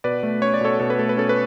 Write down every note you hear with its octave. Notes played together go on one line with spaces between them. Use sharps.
B2 B4 D5
A3
C#4 C#5
D5
B2 A4 C#5
B2 A4
B4
A3 A4
B4
C#4 A4
B4